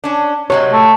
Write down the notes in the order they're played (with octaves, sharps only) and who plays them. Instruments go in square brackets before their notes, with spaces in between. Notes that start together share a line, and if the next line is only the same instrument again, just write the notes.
[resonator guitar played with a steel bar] C#4 D4
[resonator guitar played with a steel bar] C3 F#3 G#3 [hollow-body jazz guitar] C#5
[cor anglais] A3